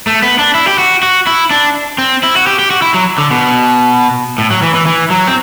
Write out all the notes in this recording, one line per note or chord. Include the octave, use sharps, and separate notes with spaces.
A3
B3
D4
E4
G4
F#4
F#4
E4
D4
C4
E4
F#4
G4
G4
F#4
E4
F#3
D3
B2
A2
F#3
E3
E3
E3
F#3
C4